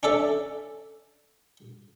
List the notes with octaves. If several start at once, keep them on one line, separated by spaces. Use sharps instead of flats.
C#4 D4 A4 E5